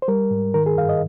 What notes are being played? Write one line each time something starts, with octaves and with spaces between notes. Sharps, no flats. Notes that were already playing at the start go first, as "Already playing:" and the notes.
C5
G3 A#4
G#2
D#3 A#4
G#4
G2 F5
D#5